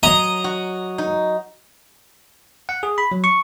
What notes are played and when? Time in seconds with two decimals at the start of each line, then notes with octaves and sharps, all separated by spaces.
0.03 F#3 D#5 A#5
0.44 F#4
0.98 D#4
2.69 F#5
2.83 G#4
2.98 B5
3.12 F#3
3.24 C#6